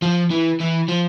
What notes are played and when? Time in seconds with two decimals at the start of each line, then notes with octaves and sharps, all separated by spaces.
0.02 F3
0.31 E3
0.60 E3
0.89 F3